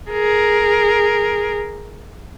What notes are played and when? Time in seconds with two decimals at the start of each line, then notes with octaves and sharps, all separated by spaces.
0.11 G#4 A#4